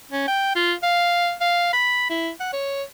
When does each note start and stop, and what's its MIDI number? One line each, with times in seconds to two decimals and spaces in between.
0.12 0.27 61
0.28 0.51 79
0.55 0.73 65
0.83 1.33 77
1.41 1.73 77
1.73 2.09 83
2.10 2.31 64
2.40 2.50 78
2.53 2.83 73